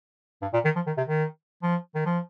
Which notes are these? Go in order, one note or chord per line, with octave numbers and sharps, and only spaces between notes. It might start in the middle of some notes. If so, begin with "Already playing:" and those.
G2
A#2
D#3
F3
D#3
C3
D#3
F3
D#3
F3